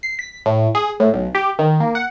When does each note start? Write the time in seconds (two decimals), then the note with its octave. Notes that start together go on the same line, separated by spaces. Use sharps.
0.03 C7
0.19 B6
0.46 A2
0.75 G#4
1.00 A2
1.14 B1
1.35 G4
1.59 D#3
1.80 A#3
1.95 F#5